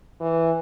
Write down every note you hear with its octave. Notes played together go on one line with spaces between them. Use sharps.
E3